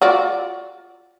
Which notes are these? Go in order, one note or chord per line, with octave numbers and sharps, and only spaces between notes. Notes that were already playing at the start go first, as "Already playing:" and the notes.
F4 F#4 D5